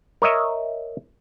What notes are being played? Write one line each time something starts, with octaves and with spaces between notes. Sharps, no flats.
A#4 C#5 D#5 E5